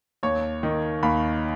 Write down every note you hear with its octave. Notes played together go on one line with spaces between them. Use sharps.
D#2 C#5
D#3
D#2 B5